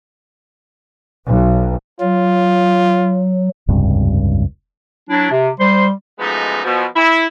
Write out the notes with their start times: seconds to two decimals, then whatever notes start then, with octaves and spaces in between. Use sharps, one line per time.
1.28 B1
2.01 F#3 F4
3.69 F1 C#2 G2 C3
5.10 F#3 D4 E4
5.32 C3
5.60 G3 C5 C6
6.19 F#2 F3 G#3 A3 B3 D#4
6.64 B2 F3
6.96 E4